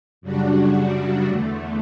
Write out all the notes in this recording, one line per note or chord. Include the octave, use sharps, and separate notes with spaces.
F#2 C#3 G3 D4 F#4
E2 D3 A3